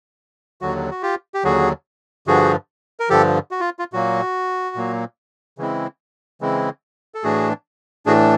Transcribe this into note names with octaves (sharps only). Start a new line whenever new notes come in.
D#2 D3 F#3 F#4
F#4
F4 G4
G4
D#2 D3 F#3 F#4 G#4
G2 D3 F3 F#4 G#4
A#4
G2 D3 F3 G4 A4
F#4
F4
F4
A#2 F#3 A#3 F#4
A#2 F#3 A#3
C#3 E3 G#3 C4 E4
C#3 E3 G#3 C4 E4
A4
A2 E3 A3 D4 F#4 G#4
A2 E3 A3 D4 F#4 G#4